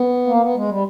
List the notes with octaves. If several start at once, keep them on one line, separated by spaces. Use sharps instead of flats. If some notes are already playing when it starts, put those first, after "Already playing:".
Already playing: B3
A#3
B3
G#3
G3